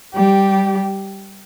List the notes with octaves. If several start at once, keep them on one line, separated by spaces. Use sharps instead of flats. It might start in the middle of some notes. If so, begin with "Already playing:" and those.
G3 G4